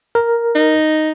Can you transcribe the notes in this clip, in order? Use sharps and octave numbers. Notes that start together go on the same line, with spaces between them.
A#4
D#4